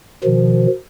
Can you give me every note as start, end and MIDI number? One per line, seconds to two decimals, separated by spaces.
0.24 0.67 47
0.24 0.67 51
0.24 0.67 53